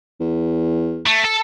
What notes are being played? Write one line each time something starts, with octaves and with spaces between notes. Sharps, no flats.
E2
A3
A4